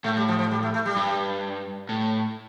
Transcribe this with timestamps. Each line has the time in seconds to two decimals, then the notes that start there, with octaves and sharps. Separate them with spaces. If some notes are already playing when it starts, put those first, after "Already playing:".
0.04 A2 A3
0.17 G3
0.28 F3
0.39 F3
0.51 G3
0.63 A3
0.74 A3
0.86 G3
0.96 G2
1.89 A2